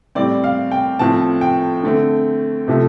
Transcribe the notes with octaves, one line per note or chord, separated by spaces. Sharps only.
A2 G3 C4 D5
F5
G5
A2 F3 A3 C4 A5
G5
D3 A3 C4
C3 F3 A3